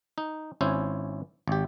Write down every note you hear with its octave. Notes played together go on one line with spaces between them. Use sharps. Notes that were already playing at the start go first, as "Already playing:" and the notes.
D#4
G#1 C#4 E4 C5 G#5
G#1 G4